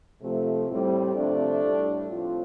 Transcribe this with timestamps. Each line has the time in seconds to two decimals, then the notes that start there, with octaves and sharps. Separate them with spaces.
0.22 C3 F3 A3
0.69 A2 G3 C4
1.16 C3 F3 A3 D4
1.62 A2 G3
2.09 A2 F3 C4 F4